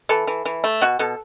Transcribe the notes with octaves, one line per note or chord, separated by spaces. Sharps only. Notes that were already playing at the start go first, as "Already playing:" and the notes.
E3 A4
E3
E3
A3
B2 F#4
B2 A4